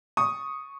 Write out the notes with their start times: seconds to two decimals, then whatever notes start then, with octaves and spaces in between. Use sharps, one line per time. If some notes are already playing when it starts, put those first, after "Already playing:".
0.17 C#6 D#6